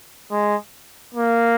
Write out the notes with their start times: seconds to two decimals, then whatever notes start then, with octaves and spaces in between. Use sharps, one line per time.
0.31 G#3
1.15 A#3